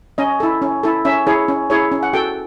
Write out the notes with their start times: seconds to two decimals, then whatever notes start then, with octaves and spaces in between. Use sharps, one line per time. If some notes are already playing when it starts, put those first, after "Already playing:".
0.18 C#4 D#5
0.40 E4 A4
0.62 C#4
0.83 E4 A4
1.05 C#4 E5
1.27 E4 G#4 C#5
1.48 C#4
1.70 E4 G#4 C#5
1.92 C#4
2.03 F#5
2.13 F#4 A4 G5